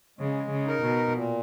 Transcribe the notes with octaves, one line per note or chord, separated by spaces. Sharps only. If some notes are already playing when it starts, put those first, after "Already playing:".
C#3 G#3
C#3
D#4 A#4
B2
A#2